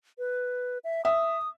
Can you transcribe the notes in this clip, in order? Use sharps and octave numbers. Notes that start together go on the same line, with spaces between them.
B4
E5
E5 D#6